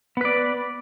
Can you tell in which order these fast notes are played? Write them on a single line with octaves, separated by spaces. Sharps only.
B3 B4 D5